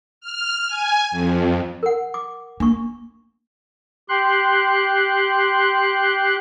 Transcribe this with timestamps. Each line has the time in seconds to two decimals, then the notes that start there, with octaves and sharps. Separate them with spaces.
0.21 F6
0.68 G#5
1.11 F2
1.83 A#4 F#5
2.14 D6
2.60 A#3 D4 C#6
4.09 G4 C6 F#6